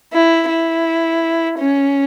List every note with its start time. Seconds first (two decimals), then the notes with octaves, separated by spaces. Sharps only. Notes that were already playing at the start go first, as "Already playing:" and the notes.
0.13 E4
0.49 E4
1.59 C#4